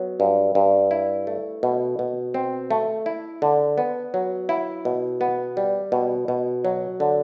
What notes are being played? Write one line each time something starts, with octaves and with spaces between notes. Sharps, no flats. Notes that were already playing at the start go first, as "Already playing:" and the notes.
Already playing: F#3 B3
G2
G2
E4
A3
B2
B2
C4
A3
E4
D3
B3
F#3
E4
B2
B3
G3
B2
B2
F#3
D3